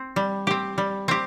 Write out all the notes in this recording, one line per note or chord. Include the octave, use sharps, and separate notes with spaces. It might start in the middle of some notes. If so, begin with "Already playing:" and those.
Already playing: C4
G3
C4 G4
G3
C4 G4